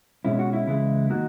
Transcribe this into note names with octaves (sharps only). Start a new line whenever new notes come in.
B2 G#3 C#4 E4
F#4
E4
C#2 C#3 E3 G#3 E4
D#3 A#3 D#4 F#4